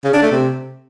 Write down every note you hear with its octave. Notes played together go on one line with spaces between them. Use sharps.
C#3
D4
A3
C3